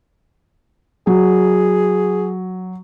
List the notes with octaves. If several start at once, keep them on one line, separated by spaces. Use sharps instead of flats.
F#3 G#4